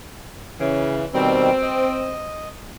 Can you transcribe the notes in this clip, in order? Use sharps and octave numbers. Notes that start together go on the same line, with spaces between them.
C#3 E3
B2 D#3 G3 C4
D#5